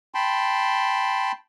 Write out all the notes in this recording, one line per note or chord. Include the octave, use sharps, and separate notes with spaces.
G5 A5 B5 C6